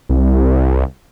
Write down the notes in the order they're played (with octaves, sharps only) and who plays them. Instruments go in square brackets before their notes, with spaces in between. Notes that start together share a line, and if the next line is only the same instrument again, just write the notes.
[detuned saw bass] C2